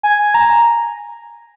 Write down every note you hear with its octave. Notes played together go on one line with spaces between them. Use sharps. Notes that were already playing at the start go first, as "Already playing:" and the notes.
G#5
A#5